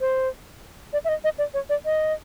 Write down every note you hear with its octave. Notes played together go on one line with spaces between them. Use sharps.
C5
D5
E5
D#5
D#5
D5
C#5
D5
D#5